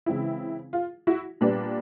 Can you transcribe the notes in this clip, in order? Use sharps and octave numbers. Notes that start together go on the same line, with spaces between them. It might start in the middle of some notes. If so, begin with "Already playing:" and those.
C#3 E3 G#3 C4 E4
F4
E4 F#4
A#2 G3 B3 D4